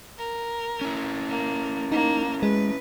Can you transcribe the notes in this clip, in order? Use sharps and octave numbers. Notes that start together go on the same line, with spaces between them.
A#4
C#4 E4
A#3
A#3 D#4
G#3 B4